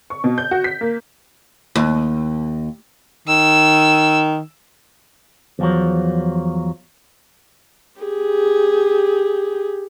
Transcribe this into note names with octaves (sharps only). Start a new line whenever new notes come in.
C#6
B2
G6
F#4
B6
A#3
D#2
D#3 E6
E2 F3 F#3
G4 G#4